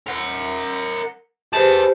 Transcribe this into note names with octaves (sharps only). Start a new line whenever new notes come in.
A#4 F#5
G4 G#4 B4 C5 A5